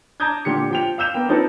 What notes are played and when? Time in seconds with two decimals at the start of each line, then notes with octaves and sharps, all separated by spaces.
0.20 A5 A#5 D6 D#6 G6 G#6
0.45 A#2 D3 G4 C#7
0.71 F3 G5 F7
0.98 F5 E6 G6 E7 F7
1.14 A#3 B3 G5
1.29 F3 C4 D#4 A4 B4